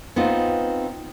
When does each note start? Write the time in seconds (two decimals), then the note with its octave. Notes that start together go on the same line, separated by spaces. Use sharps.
0.16 B3 C4 D#4 F4